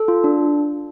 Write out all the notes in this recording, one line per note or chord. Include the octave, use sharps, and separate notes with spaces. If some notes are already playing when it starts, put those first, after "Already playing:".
Already playing: A4
F4
D4